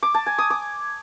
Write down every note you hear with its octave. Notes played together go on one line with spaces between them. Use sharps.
D6
A5
G#5
D#6
D6